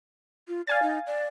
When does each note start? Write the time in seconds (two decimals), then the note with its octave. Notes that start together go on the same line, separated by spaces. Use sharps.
0.48 F4
0.67 D5 F5 G#5 A6
0.83 D#4
1.07 D5